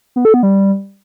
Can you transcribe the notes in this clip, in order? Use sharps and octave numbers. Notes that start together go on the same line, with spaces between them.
B3
A4
B3
G3